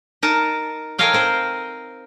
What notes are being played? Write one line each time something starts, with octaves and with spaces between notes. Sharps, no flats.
D#4 A#4 A5
A4 A#4 C#5 D#5 F5 G5
C4 A#4 C5